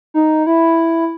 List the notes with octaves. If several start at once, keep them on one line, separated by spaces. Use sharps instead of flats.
D#4
E4